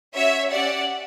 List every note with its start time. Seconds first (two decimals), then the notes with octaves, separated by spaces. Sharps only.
0.14 C#4 F#4 C#5 E5
0.52 C#4 G4 D5 F#5